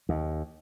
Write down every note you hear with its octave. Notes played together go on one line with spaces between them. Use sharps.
D#2